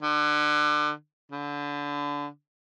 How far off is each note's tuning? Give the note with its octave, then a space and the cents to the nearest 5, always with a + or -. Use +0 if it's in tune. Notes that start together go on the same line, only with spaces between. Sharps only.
D3 +30
D3 -25